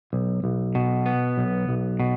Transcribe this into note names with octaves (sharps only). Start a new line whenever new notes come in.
B1
B1
B2
B3
B1
B1
B2